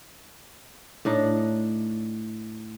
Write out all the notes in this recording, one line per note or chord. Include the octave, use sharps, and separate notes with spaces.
A2 D4 D#4